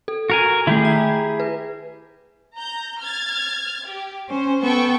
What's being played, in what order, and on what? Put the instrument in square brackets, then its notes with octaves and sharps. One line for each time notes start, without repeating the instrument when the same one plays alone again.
[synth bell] A4
[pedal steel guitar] F#4 A#4 G#5
[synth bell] D#3 A3 [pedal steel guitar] E4 G4 G#4
[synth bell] A#5
B4
[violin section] A#5 G6
F6 G#6 A6
G4
[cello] C#4 [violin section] C5
[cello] B3 [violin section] A4 G5 C#6